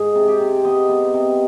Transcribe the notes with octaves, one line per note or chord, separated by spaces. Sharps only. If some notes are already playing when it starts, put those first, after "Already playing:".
Already playing: G#2 G#4
C3
G4
C3
B3 D#5
B3
C3